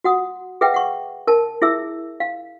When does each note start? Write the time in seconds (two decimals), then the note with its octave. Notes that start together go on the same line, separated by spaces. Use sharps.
0.04 F#4 F#5 D#6
0.61 G#4 B4 E5 F#5 G5
0.74 F#5 C#6
1.27 A#4 A5
1.62 E4 G#4 E5 E6
2.20 F5